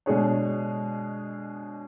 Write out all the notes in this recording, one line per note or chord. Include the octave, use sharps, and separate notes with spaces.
B2 G#3 D4 G#4 C#5